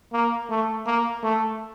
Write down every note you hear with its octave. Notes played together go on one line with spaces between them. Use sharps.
A#3
A3
A#3
A3